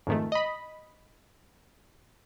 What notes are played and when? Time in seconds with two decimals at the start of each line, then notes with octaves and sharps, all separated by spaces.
0.07 F2 G#2 D#3 A3
0.32 D#5 B5